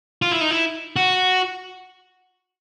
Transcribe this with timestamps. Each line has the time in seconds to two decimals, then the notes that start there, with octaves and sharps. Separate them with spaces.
0.22 F4
0.31 E4
0.41 D#4
0.51 E4
0.96 F#4